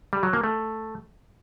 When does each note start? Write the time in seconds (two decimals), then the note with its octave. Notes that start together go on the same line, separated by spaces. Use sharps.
0.13 G3
0.23 F#3
0.33 A#3
0.44 A3